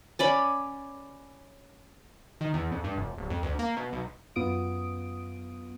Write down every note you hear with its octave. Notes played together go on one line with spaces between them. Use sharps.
C#4 D5 B5
D#3
E2
F2
G2
F1
D1
F2
D2
A#3
B2
B1
F#2 B3 F4 D#6 D7